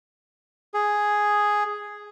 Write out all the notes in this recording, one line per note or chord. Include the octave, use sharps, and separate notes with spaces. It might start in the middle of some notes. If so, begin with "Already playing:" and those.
G#4